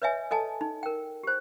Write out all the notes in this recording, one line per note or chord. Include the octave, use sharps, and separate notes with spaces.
B4 C#5 D#5 E5 G#5
A4 D#5 G#5 A5
D#4
A#4 G5
G4 C5